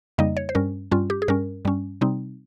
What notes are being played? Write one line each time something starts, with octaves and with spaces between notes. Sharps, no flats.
F2 C#3 G3 A#3 D#4 D#5
C#5
C5
G2 G3 C#4 A#4
G2 G3 C#4 F4
G4
G#4
G2 G3 C#4 A#4
G2 G3 C#4
C3 G3 C4 D#4